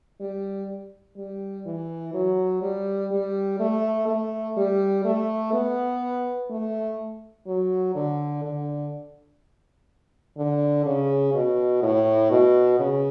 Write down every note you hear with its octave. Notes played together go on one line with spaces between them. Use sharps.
G3
G3
E3
F#3
G3
G3
A3
A3
G3
A3
B3
A3
F#3
D3
D3
D3
C#3
B2
A2
B2
C#3